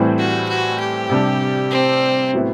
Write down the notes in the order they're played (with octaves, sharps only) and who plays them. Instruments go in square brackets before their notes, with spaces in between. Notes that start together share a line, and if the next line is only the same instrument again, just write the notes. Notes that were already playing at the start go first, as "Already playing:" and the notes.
Already playing: [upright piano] A2 E3 G3 C4
[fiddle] F#4
F#4
G4
[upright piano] C3 G3 D4
[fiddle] C4
[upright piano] A2 F#3 B3 E4